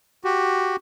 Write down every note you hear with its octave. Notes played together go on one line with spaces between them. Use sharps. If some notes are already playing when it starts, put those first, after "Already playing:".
F#4 G4